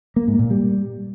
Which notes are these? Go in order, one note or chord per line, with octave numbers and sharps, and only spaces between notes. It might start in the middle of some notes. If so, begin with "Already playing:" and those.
A#3
G#2
A#2
G3